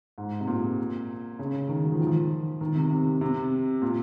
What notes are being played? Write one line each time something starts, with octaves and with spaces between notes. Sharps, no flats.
G#2
C3
A#2
C#3
D#3
F#3
F3
D#3
F3
D#3
C3
C3
C3
A#2